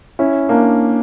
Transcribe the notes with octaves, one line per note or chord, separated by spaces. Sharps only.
C#4 E4
A#3 D4